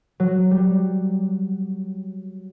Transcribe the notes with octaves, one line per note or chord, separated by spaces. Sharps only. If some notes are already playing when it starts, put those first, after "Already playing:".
F#3
G3